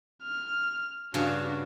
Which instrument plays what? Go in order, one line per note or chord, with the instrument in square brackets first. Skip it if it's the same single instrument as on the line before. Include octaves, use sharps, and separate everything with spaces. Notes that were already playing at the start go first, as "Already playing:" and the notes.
[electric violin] F6
[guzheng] G2 C#3 [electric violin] D4 F#4